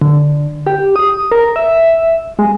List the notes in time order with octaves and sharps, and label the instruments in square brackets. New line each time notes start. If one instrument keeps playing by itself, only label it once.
[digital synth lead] D3
G4
D#6
A#4
E5
G#3